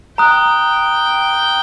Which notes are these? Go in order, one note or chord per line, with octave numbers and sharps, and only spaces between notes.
G5 A#5 D#6 F#6